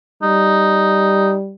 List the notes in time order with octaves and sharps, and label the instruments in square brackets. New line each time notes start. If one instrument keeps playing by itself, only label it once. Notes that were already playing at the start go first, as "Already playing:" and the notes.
[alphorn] G3 [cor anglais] D#4